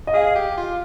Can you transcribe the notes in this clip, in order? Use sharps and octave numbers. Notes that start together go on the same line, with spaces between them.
D#5
G#4 F5
G4
F4